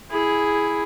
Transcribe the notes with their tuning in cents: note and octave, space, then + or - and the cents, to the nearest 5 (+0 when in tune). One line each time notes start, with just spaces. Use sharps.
E4 +0 G#4 +0